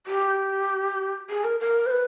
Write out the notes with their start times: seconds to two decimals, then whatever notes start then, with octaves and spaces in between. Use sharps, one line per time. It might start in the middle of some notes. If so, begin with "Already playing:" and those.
0.06 G4
1.29 G#4
1.44 A#4
1.59 A#4
1.86 C5
1.90 B4